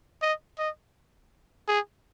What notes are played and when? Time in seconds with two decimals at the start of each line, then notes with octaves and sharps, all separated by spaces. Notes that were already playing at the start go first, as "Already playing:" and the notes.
0.22 D#5
0.59 D#5
1.68 G#4